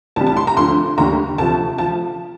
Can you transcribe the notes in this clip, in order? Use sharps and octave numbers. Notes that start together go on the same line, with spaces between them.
C2 C3 G3 A5
A5
C6
A#5
D2 D3 F3 C6
D#2 D3 G3 A#5
D2 C3 F3 A5
F3 A5